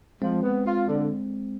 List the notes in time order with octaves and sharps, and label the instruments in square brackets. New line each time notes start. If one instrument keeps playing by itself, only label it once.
[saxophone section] F3 [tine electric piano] G#3 C4
[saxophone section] B3
F4
D3